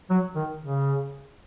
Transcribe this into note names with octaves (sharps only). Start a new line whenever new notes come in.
F#3
D#3
C#3